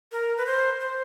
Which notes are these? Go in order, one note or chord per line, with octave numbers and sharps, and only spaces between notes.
A#4
B4
C5
C5